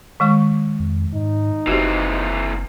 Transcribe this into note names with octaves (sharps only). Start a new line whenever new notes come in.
D#3 G#3 C#6
F2
G#2 D#4
F#1 E3 C4 F#4 G4